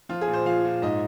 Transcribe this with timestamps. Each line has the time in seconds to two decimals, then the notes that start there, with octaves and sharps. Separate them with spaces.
0.09 F3 F4
0.21 G#4
0.28 A#2
0.33 C5
0.46 F3 F5
0.64 A#2
0.82 G#2 D#5